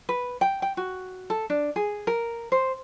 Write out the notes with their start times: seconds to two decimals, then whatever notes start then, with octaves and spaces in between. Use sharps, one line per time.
0.09 B4
0.41 G5
0.62 G5
0.77 F#4
1.30 A4
1.50 D4
1.76 G#4
2.07 A#4
2.52 C5